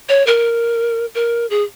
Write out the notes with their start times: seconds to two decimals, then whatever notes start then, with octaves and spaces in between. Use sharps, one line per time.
0.09 C#5
0.27 A#4
1.15 A#4
1.50 G#4